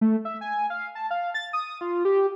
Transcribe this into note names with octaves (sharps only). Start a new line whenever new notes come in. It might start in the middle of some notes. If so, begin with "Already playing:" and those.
A3
E5
G#5
F5
A5
F5
A6
D#6
F4
G4